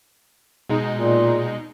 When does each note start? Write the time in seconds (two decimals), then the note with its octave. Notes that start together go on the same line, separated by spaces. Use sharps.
0.69 B2 G#3 D#4
0.93 A#2